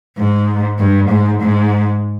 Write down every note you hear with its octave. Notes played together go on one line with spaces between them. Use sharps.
G#2
G2
G#2
G#2